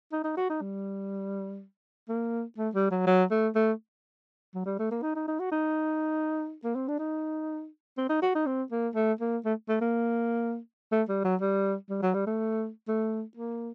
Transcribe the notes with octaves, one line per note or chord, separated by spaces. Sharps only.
D#4
D#4
F#4
D#4
G3
A#3
A3
G3
F#3
F#3
A3
A3
F#3
G3
A3
A#3
D#4
D#4
D#4
F#4
D#4
A#3
C4
D4
D#4
C4
D#4
F#4
D#4
C4
A#3
A3
A#3
A3
A3
A#3
A3
G3
F#3
G3
G3
F#3
G3
A3
A3
A#3